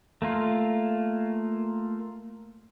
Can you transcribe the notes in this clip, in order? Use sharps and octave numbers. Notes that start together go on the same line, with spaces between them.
A3 A#3 F4